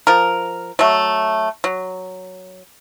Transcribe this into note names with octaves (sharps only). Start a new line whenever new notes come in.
F3 A#4
F#3 A3
F#3